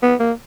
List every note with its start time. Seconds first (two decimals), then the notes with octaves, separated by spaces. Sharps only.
0.03 B3
0.20 A#3